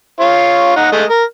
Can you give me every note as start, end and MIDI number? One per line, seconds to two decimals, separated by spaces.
0.20 0.76 65
0.20 0.76 73
0.76 0.91 63
0.76 0.91 78
0.92 1.04 56
0.92 1.04 57
0.92 1.04 75
1.09 1.23 70